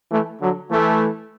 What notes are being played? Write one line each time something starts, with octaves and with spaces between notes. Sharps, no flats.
E3 A3
D3 F#3
E3 A3